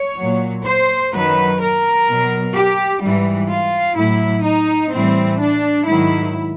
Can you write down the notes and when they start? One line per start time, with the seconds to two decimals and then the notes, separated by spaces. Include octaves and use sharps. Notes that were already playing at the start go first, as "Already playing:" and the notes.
Already playing: C#5
0.18 A#2 F#3
0.65 C5
1.12 F#2 D#3 F#3 B4
1.60 A#4
2.07 B2 F#3
2.55 G4
3.03 G#2 E3 G3
3.50 F4
3.97 A2 F#3 E4
4.45 D#4
4.93 A2 E3 G3 C4
5.41 D4
5.88 G#2 D#3 F#3 E4